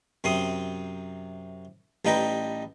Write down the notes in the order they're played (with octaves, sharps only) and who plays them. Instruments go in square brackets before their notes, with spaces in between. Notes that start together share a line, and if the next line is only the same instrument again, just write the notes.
[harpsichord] F#2 C3 C4 C6 D#6
A1 G3 D#4 B4 G5 A#5